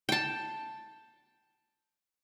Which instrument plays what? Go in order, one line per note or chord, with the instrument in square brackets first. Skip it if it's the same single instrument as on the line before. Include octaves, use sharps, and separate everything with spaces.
[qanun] G5 A5